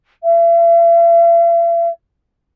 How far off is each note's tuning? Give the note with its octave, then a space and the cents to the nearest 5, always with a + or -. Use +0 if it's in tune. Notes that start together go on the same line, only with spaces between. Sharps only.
E5 +45